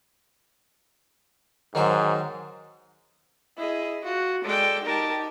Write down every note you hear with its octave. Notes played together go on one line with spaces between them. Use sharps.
G#2 D#3 F#3 C5
E4 G#4 D#5
F4 F#4
G#3 A4 D5 G5
D#4 G4 A#4 A5